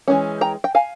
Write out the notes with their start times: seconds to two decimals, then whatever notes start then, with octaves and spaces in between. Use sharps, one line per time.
0.08 E3 G#3 C#4
0.41 G5 A#5
0.64 G5
0.75 F5 G#5